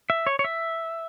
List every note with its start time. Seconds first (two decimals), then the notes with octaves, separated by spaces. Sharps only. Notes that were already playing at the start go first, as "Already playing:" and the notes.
0.10 E5
0.27 C#5
0.39 C#5
0.44 E5